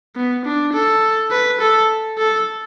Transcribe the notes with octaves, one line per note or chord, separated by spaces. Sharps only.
B3
D4
A4
B4
A4
A4